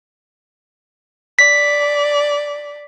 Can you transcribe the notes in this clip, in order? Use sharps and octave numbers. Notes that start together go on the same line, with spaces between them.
D5 B6